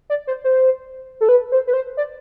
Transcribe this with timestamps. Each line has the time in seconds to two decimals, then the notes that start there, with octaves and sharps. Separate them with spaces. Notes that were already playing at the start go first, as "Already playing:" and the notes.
0.10 D5
0.27 C5
0.44 C5
1.21 A4
1.29 B4
1.52 C5
1.67 B4
1.73 C5
1.97 D5